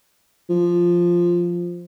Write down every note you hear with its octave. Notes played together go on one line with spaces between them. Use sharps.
F3